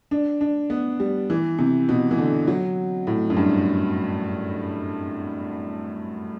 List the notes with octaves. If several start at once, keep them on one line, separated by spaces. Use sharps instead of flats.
D4
D4
B3
G3
E3
C3
B2
E3
D3
F#3
A2
F#2
G2